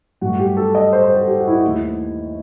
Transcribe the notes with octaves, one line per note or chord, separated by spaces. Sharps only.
G2 F#3 A3 F#4
G4
A4
D#5
C5
C5
A4
G4
F#4
E4
F#4
D#2 D#3 A3 E4